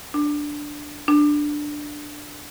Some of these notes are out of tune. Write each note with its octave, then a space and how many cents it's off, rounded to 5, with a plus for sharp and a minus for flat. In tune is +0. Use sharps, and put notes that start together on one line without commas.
D4 +0
D4 +5